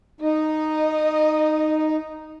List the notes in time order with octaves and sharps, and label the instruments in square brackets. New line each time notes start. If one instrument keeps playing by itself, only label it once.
[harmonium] D#4 [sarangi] D#5